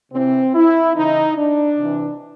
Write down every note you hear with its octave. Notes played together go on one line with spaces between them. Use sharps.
C3 E3 C4
E4
C#3 E3 D#4
D4
C3 E3